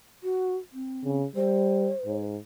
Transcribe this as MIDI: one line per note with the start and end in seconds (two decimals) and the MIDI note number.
0.23 0.57 66
0.73 1.17 60
1.04 1.26 49
1.36 1.91 55
1.36 2.20 72
2.06 2.38 44